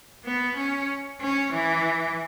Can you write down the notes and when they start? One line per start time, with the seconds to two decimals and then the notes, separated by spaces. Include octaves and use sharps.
0.25 B3
0.57 C#4
1.21 C#4
1.53 E3